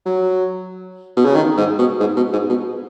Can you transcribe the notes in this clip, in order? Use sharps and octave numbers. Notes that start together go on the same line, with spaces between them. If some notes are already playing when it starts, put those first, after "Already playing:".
F#3
B2
C#3
D#3
G#2
B2
G#2
B2
G#2
B2